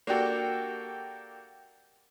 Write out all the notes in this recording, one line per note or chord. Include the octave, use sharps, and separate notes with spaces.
A#3 D4 F#4 G4 A4